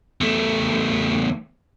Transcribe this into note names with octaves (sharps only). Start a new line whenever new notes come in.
E2 A3